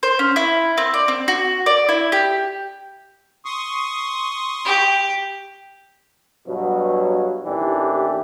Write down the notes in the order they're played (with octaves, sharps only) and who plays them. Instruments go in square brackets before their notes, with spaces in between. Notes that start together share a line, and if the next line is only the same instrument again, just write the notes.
[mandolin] C5
C#4
E4
C4
D5
C4
F#4
D5
E4
G4
[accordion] C6 C#6 D#6
[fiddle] G4
[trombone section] G2 B2 F#3
A1 D#2 E3 D4 G4